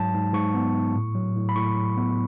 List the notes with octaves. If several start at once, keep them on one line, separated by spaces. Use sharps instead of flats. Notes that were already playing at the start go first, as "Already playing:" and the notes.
Already playing: G#2 F#3 A5
G#2
G#2 C#6
B3
G#2
A2
F#3
A2
B5
A2 C#6
F#3
B3